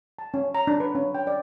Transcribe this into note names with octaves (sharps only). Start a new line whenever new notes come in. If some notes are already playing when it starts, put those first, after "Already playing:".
A5
C#4
A#5
D4
B4
C#4
G5
D5